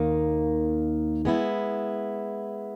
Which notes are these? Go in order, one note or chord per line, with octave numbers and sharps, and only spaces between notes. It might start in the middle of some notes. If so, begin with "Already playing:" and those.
Already playing: D#2 D#3 A#3 D#4
G#3 B3 E4